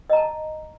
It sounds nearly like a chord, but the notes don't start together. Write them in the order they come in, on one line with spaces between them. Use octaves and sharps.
D#5 A#5 A5